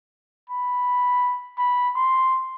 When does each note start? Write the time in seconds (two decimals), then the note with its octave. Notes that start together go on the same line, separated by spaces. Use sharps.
0.50 B5
1.59 B5
1.97 C6